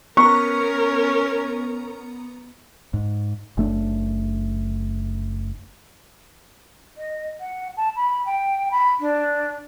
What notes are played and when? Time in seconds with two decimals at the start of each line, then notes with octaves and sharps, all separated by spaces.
0.17 B3 C#4 A#4 A#5 C#6
2.94 G#2
3.57 F#1 A3 D4
6.97 D#5
7.40 F#5
7.77 A5
7.96 B5
8.26 G5
8.71 B5
9.00 D4